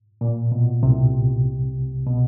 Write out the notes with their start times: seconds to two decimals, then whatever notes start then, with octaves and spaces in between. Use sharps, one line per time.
0.21 A#2
0.52 B2
0.83 C2 C3
2.07 B2